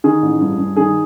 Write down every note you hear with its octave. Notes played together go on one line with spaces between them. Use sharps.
D#3 G#4
A1
G2
G2
D#3 G#4